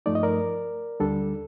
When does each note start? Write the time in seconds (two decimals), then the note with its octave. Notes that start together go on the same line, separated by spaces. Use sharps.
0.06 G2 F3 A3 D#4 D5
0.15 D#5
0.23 A#4 D5
1.00 D2 D3 G3 D4 A4